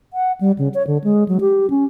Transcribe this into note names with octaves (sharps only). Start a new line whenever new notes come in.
F#5
G3
C#3
C#5
D3
G#3
F#3
G4
C#4